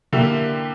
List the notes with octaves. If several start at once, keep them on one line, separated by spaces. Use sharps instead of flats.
D3 A#3 E4 G4